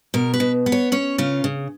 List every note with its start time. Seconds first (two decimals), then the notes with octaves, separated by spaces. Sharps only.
0.14 B2 A#4
0.34 B4
0.40 B2
0.66 B3
0.72 C#5
0.92 C#4 C#5
1.18 C#3 F4
1.44 C#3